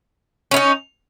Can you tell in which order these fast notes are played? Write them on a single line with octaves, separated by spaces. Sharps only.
C#4 E4 D#4